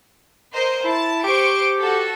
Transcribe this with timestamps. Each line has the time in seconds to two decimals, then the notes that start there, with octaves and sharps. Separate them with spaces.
0.53 A#4 C5 D#5
0.84 E4 A5
1.24 G4 C5 C#6 D7
1.80 F#4 A4